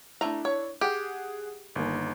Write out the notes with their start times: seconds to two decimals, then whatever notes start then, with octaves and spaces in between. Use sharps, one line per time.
0.21 A3 D4 E4 A#5
0.45 C#5
0.81 G4 G#4 F#5
1.76 G1 D#3 A#3